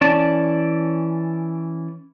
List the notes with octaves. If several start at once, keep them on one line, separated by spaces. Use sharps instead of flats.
E3 C#4 D5 A5